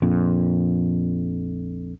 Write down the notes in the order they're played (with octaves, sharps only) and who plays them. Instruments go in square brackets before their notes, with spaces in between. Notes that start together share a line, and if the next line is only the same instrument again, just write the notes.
[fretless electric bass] A#1 F2